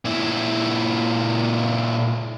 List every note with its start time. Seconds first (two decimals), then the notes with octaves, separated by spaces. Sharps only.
0.05 A#2 E4